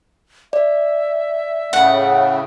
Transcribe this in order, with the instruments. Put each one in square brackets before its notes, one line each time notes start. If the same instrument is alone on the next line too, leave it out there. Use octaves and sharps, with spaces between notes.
[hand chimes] D5 [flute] E5
[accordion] A2 C#3 A3 [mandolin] F#5